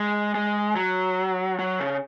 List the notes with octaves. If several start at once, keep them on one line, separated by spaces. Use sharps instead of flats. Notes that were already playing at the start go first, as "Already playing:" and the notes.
Already playing: G#3
G#3
F#3
F#3
C#3